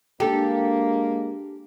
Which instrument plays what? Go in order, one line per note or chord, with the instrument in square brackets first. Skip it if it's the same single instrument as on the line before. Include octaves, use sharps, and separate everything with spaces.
[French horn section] G#3 A#3 [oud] D4 [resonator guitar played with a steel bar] G4 A4